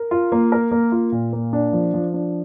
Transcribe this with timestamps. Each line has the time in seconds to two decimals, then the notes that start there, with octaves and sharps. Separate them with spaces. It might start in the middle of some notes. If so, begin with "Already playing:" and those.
Already playing: A#4
0.11 F4
0.32 A#3
0.52 A#4
0.71 A#3
0.92 F4
1.12 A#2
1.33 A#3
1.53 D4
1.73 F3
1.94 F3
2.14 D4